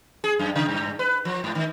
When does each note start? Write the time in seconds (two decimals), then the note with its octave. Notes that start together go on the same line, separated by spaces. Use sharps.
0.24 G#4
0.39 F#2
0.56 C#3
0.69 G2
0.99 B4
1.25 F3
1.44 G#2
1.55 D#3